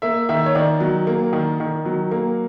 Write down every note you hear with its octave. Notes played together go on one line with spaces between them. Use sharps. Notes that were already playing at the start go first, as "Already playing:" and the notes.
A#3 E5
D#3 E5
C#5
D#3 D5
F#3
A#3
D#3
D#3
F#3
A#3